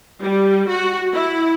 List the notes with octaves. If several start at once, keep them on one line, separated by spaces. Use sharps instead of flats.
G3
F#4
E4